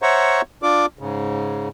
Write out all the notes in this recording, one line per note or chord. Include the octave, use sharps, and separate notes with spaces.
C5 C#5 E5 F#5 A#5 C#6
D4 F4 D5 D6
G#2 C#3